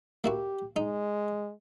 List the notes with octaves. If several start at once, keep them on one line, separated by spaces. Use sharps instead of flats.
A#3 E4 F#4 G4
G#3 D#4